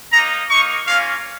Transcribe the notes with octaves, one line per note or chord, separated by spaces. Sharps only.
A#3 D#4 A#5
A#3 D#4 C#6
A#3 C#4 F4 F5